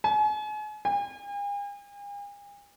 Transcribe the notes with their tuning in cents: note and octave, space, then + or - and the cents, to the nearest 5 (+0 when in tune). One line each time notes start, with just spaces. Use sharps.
G#5 +40
G#5 -45